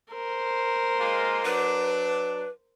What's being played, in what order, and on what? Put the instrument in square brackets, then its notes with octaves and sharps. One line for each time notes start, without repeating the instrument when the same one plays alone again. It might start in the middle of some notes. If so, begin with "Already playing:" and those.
[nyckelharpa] A#4 C5
[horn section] G#3 A#3 F4
[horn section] F#3 D4 [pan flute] B4